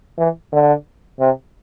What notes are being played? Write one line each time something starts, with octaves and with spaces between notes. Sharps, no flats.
E3
D3
C3